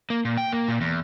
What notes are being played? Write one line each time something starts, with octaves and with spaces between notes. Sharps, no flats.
A#3
A#2
G5
A#3
A#2
E2